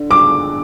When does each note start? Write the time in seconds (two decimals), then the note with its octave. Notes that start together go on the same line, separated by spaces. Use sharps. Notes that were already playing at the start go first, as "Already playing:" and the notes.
Already playing: D3
0.11 D6